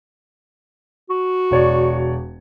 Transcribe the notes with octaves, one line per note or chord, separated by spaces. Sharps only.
F#4
E1 C#5 D5